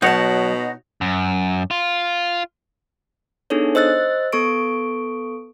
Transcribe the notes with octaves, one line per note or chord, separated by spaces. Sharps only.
B2 F#3 D#4 F#4 C#5 A5
F#2
F4
B3 D4 D#4 G#4 A4 C#5
C5 D#5 E6 F#6 A6
B3 A4 C#6 D7